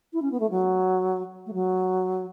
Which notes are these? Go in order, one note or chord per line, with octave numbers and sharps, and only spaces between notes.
E4
C#4
B3
A3
F#3
A3
F#3